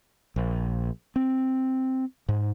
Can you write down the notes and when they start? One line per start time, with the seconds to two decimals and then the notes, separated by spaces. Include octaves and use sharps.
0.36 A#1
1.16 C4
2.29 G#2